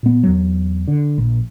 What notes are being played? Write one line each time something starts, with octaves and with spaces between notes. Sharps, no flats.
A#2 B3
E2 F#3
D3
A#1